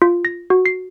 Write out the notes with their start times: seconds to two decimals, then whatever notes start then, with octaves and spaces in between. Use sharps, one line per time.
0.02 F4
0.25 A#6
0.50 F#4
0.66 C7